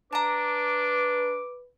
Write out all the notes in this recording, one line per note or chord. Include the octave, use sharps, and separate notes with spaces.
D4 B4 A5 A#5 D6